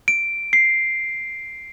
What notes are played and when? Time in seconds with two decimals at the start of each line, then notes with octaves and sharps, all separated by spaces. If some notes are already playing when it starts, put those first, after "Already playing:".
0.08 D7
0.53 C7